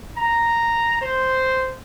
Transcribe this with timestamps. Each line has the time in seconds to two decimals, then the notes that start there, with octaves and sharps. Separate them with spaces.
0.18 A#5
1.02 C5